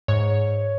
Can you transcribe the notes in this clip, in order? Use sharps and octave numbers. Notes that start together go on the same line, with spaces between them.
G#2 C#5